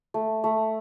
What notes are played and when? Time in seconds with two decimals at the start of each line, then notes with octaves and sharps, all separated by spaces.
0.14 A3
0.44 A3